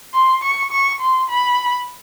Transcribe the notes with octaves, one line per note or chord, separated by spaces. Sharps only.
C6
C#6
C#6
C6
B5